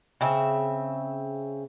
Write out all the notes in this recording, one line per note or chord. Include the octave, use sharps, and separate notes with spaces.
C#3 C4 E5